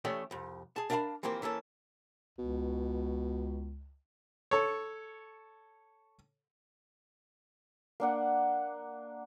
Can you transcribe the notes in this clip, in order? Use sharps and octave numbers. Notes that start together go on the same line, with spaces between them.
E3 A3 C#4 G4 D5 D#5
C2 F2
G#4 A5
D4 A#4 E5 F5 A5 B5
E3 F3 A#3 C4 G4 A#4
E3 A#3 C#4 A4
C#2 B2
A4 C#5
A#3 D4 F#5